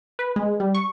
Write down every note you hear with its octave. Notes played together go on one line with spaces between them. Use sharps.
B4
G#3
G3
C#6